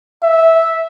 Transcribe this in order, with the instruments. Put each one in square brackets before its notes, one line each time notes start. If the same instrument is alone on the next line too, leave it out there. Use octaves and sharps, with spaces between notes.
[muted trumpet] E5